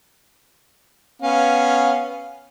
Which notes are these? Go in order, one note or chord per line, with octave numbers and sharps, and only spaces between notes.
B3 C#4 F5